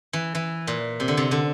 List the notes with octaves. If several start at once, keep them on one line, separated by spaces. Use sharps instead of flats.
E3
E3
A#2
C3
D3
C3
D3